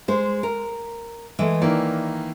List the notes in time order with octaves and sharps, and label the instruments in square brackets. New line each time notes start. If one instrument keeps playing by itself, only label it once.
[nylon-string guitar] G#3 C5
A#4
E3 G#3 A3
[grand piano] D#3 E3 A#3 [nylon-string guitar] D5